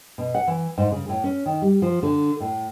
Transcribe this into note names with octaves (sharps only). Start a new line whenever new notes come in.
B2
F#5
E3
G#2
C#3
A2
C#4
D#3
G3
F3
D3
A2